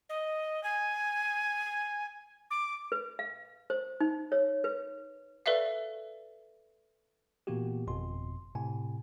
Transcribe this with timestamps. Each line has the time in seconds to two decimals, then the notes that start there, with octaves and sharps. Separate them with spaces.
0.09 D#5
0.64 G#5
2.51 D6
2.92 B4
3.19 F5
3.70 C5
4.00 D#4
4.32 C#5
4.64 B4
5.46 A4 B4 D5 E5 F5
7.47 A#2 E3 A#3 B3 F#4 G4
7.87 G1 F2 B2 C6
8.55 A2 C3 G#5